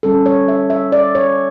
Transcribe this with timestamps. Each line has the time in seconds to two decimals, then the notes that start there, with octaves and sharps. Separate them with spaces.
0.03 D3 G3 C#4 A4
0.26 C#5
0.48 E5
0.70 E5
0.92 D5
1.15 C#5